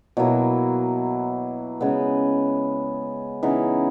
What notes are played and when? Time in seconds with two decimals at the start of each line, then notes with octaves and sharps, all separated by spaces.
0.17 B2 F#3 A#3 E4
1.81 C#3 G#3 B3
3.43 C#3 E3 B3 D#4